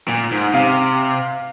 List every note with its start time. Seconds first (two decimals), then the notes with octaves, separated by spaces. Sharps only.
0.08 A#2
0.31 G#2
0.54 C3 F5